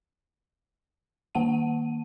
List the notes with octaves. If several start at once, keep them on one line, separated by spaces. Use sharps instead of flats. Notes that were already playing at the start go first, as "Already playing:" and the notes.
D#3 A#3 F#5 A5 D#7